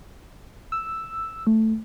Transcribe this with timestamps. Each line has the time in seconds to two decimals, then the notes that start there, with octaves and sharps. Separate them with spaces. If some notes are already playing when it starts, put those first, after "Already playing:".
0.72 E6
1.47 A3